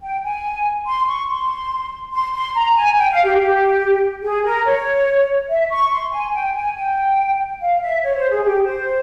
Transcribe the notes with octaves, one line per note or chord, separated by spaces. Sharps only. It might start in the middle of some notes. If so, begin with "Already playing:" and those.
G5
G#5
C6
C#6
C6
C6
C6
A#5
G#5
G5
F5
G4
G4
G#4
A#4
C#5
E5
C#6
C6
G#5
G5
G#5
G5
F5
E5
C#5
C5
G#4
G4
C5